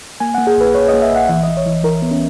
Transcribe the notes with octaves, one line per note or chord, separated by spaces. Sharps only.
A#3 G#5
A#3 F#5
G#4
A#1 B4
A#1 C#5
D#5
A#3
E5
A#1 F#5
E3 E5
E3 D#5
C#5
E3
E3 A#4
B3
C#4